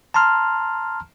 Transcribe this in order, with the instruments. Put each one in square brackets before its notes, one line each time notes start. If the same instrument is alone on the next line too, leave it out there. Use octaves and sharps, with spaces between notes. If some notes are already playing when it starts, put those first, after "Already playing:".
[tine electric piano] A5 A#5 C6 F6